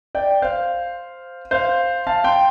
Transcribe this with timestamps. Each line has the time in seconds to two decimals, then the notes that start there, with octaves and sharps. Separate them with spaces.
0.15 D5 G5
0.42 C5 F5
1.51 C5 F5
2.07 F5 A5
2.24 G5 C6